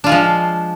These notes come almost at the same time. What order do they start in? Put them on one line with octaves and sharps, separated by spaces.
D4 F4 G#3 F3